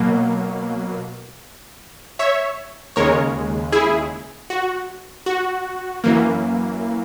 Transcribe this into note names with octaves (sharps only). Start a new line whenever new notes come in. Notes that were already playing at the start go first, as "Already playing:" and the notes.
Already playing: B2 F#3 A#3
C#5 E5
D#2 C#3 G#3 A#4 C#5
E4 G#4
F#4
F#4
F#2 E3 A#3